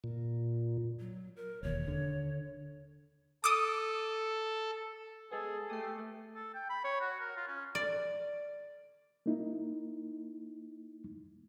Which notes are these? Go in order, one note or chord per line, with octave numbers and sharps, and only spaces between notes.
A#2
F#3
A#4
E1 D#2 C#5
D3
A4 D6 D#6
G#3 B3 G#4 A4
A3 G4 D#6 C7
A4
G5
B5
C#5
F#4
A#4
F4
C#4
D5
A#3 D#4 E4